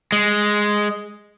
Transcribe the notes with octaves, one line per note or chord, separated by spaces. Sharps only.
G#3